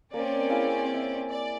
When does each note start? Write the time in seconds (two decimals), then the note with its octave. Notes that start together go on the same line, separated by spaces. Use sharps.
0.13 A#3 C4 C#4 A#4 D5
0.50 E4 G#4 F5
0.94 E5
1.28 D5